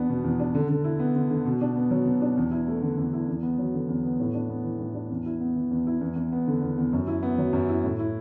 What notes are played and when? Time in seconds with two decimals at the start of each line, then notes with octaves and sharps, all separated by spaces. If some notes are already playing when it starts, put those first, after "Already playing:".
Already playing: E2 B3 D4
0.09 B2
0.24 E2
0.40 D4
0.55 D3
0.69 D3
0.84 E4
0.99 B3
1.15 D3
1.30 D3
1.45 B2
1.61 D4
1.76 B3
1.91 F#3
2.06 B2
2.22 D4
2.37 E2
2.51 E4
2.68 A3
2.82 D3
2.97 E2
3.13 E4
3.28 E2
3.42 B3
3.58 F#3
3.74 D3
3.88 E2
4.03 B3
4.20 A2
4.34 D4
4.49 B3
4.64 E3
4.79 A2
4.94 D4
5.10 E2
5.26 E4
5.40 B3
5.56 E3
5.71 E2
5.87 E4
6.01 E2
6.16 E2
6.32 B3
6.47 D3
6.62 E2
6.78 E2
6.93 F#2
7.07 E4
7.23 B3
7.38 F#3
7.53 F#2
7.69 E4
7.84 A2
7.99 E4